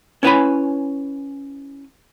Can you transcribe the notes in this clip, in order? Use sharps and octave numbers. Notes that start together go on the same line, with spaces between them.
C#4 E4 B4 C#5 G#5 B5